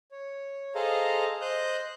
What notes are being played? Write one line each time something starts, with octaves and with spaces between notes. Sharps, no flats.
C#5
G#4 A4 C5 D#5 F5 A#5
C5 D#5 D#6 F#6 G6